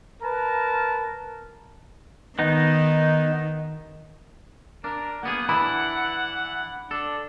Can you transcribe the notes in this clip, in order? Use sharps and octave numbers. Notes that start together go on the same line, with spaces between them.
A#4 B4 A5 A#5
D#3 B3 D#4
D4 A#4
A#3 B3 G#4 F#5
E3 D4 E4 B5
D4 A4